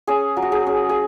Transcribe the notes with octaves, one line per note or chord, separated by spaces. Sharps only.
C#4 G#4
F#3
F#4
G#4
C#4
G#4